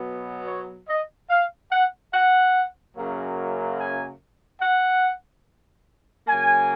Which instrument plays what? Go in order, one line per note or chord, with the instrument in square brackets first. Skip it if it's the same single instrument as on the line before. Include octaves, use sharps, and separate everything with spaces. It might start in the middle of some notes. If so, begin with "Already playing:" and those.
Already playing: [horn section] B2 F#3 B3
C#5
D#5
F5
F#5
F#5
F#2 C#3 F#3 A#3
G#5
F#5
C#3 F#3 A#3 G#5